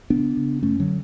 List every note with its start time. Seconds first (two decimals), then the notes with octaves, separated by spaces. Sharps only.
0.10 C#3 B3 D4
0.37 C#3
0.62 F#2 A3 C#4
0.80 D3 F#3